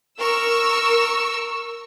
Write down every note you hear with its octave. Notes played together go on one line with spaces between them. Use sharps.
A#4 C#6 E6